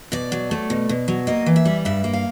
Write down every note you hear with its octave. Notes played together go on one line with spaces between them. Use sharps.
B2 D5
F#3
A3
B2
B2
F#3
A#3 D#5
E3
E5
G3
G2 E5
A#3
F5